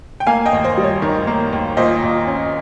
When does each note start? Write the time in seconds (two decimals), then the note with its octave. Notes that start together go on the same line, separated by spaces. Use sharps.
0.20 G5
0.27 A#3 F5 G#5
0.46 D#5 G5
0.53 D#2
0.64 C5
0.77 G3
0.84 C#5
1.02 D#3
1.27 A#3
1.53 D#2
1.77 A#2 C5 D#5
2.03 A#2
2.27 C#4